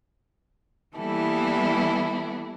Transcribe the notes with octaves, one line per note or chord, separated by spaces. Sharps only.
E3 G3 A#3 B3 E4 A4